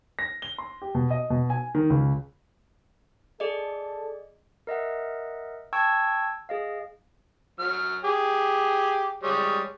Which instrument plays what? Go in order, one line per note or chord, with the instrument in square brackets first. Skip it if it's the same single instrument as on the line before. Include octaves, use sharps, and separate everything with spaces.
[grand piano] A#6
G7
C6
G4
B2
D#5
B2
G#5
D#3
C#2
[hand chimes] G#4 D5 D#5 [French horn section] A4
[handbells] A#4 D#5 E5 F#5
G5 A5 C#6 E6 G#6
G#4 D#5 F5
[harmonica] F#3 F6
G4 G#4
G3 G#3 C#5